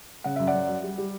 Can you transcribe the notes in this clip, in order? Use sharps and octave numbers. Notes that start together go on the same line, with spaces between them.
C#3 F#5
F#2 E5
D5 F#5
F#2
F#3
G3
G3